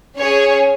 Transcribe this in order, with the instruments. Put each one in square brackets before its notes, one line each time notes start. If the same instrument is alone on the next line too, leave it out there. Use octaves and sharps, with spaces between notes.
[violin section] C#4 G#4 C#5